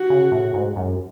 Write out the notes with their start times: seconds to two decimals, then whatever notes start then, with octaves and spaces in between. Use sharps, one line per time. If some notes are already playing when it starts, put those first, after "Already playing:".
Already playing: F#4
0.10 C#3
0.32 A2
0.54 G#2
0.76 F#2